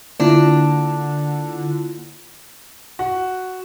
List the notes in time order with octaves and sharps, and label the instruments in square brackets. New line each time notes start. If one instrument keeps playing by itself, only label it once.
[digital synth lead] D3 [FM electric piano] A#3 E4 F4 [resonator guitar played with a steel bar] D4
[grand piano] F#4